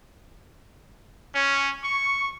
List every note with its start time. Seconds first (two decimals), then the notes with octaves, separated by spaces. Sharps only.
1.35 C#4
1.84 C#6